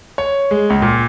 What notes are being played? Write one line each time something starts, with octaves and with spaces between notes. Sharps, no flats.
C#5
G#3
C#2
A#2